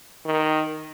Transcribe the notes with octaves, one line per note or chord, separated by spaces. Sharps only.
D#3